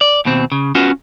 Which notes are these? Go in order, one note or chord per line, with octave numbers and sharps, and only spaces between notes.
D5
D#2 B2 C4
C#3
B3 C#4 F4 F#4